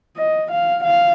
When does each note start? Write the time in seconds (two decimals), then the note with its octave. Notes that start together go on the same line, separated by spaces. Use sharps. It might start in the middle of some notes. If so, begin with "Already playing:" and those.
0.17 D#5
0.51 F5
0.84 F5